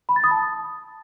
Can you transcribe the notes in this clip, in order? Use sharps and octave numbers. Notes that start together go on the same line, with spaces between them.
B5
A6
D#6
A5